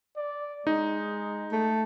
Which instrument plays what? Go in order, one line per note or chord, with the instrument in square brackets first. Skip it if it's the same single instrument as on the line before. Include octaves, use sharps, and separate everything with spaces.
[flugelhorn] D5
[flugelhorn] G#3 [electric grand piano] D#4
[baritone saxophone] A3